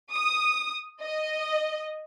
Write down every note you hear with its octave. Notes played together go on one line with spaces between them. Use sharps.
D#6
D#5